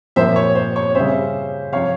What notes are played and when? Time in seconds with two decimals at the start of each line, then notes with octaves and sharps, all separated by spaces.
0.16 A#2 F3 A#3 C5 E5
0.36 C#5
0.55 C5
0.76 C#5
0.95 C#3 G3 C#4 C5 E5
1.72 C3 F3 C4 C#5 F5